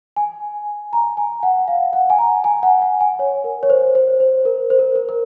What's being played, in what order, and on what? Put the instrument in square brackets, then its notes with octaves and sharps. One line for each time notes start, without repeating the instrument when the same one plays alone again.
[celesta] G#5
A#5
G#5
F#5
F5
F#5
G#5
A#5
G#5
F#5
F#5
G#5
C#5
A#4
C#5
C5
C5
C5
A#4
C5
A#4
A#4
A#4